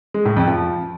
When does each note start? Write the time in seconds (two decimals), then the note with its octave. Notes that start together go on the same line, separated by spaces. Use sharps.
0.14 G#3
0.25 A2
0.36 F2
0.47 F3